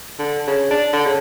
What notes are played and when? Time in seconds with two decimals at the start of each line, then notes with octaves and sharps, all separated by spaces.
0.19 D3
0.47 C#3
0.71 D4
0.93 D3
1.06 C#3